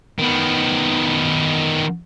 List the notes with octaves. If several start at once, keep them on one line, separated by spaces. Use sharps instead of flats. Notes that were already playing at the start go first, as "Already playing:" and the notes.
D#3 B3